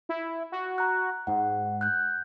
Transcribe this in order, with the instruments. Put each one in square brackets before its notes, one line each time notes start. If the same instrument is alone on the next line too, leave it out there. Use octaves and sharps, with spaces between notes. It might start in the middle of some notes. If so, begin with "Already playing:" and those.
[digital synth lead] E4
F#4
[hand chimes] A#5 F#6
[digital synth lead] G#2 [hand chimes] F#5
[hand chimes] F#6 G6